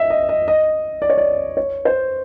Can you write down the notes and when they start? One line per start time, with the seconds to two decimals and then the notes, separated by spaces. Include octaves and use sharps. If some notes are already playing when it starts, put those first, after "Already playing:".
Already playing: D#5 E5
0.10 D#5
0.29 D#5
0.48 D#5
1.02 D5
1.10 C#5
1.18 D5
1.57 C#5
1.85 C5